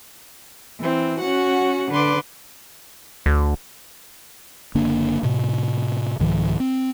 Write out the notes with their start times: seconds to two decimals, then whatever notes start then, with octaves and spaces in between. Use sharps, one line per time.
0.79 E3 C4
1.20 C#4 F#4 F#5
1.91 D3 B4 C6 D6
3.26 D2
4.75 F#1 D3 A#3 D4
5.23 A2 C3
6.19 C2 G#2 D#3 F3
6.60 C4